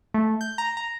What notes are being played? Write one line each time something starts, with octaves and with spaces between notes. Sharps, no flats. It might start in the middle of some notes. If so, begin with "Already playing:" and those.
A3
G6
A#5
A#5